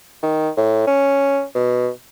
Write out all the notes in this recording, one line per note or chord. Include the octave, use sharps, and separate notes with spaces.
D#3
A2
C#4
B2